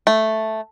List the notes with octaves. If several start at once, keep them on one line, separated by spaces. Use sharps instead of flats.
A3